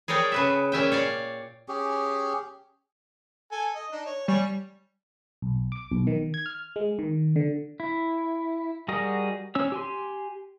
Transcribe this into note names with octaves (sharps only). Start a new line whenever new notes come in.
G#4 A#4 C#5 D5 G5
C#3 B4 E5
A#2 C#4 E5 G5
C#5 D5 F5
C#4 G4 G#4
A4 G#5
D#5
D4 D#4
C#5
G3 C#5 G#5
B1
D6
B1
D#3
G#6
F6
G#3
D#3
D3
E4
G3 F#4 G#4 A#4 D#5
C#4 C#5 E6
G4 G#5 C6